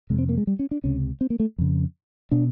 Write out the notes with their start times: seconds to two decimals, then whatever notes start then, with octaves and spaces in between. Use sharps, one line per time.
0.10 F2 C3 G#3
0.18 C4
0.29 A#3
0.38 G#3
0.47 G3
0.59 C#4
0.71 D4
0.84 C#2 C3 C#4
1.21 C4
1.30 A#3
1.40 A3
1.58 F2 C#3
2.31 B2 D4